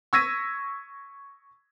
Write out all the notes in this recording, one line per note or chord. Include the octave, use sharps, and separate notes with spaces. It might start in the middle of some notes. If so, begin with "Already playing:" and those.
C#6 E6 G#6 A#6 B6 D#7